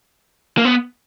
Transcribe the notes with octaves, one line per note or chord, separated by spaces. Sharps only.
A#3
B3